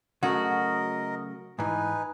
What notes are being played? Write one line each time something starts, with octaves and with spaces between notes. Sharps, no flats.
C#3 F#3 A3 F#4 A#4 D#5
G#2 E3 D#4 B4 G#5